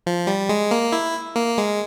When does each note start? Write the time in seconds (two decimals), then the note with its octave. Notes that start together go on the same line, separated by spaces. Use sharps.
0.07 F3
0.27 G3
0.49 G#3
0.71 A#3
0.92 E4
1.36 A#3
1.58 G#3